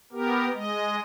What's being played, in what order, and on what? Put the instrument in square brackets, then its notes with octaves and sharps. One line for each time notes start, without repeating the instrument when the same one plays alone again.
[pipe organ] B3 G4 A#4
G#3 D#5